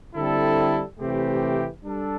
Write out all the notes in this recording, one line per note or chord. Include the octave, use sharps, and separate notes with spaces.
D3 G3 C4 E4 A4
C3 E3 A3 C4 G4
G3 D4 A4